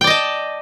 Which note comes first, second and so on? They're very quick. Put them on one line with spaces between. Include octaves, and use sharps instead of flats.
G5 D5 D#5 A5